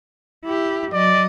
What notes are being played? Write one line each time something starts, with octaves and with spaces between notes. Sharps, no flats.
E4 G4
F#3 D5 D#5